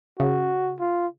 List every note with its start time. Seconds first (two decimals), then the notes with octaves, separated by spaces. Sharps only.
0.19 C#3 F#4
0.80 F4